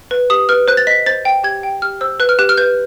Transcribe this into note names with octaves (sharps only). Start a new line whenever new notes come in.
B4
G4 D#6
B4 F6
C5 F#6
A6
D#5 B6
C5 A6
G5
G4 G#6
G5
G4 F6
C5 E6
B4 F#6
F6
G4 F#6
F6
B4 G6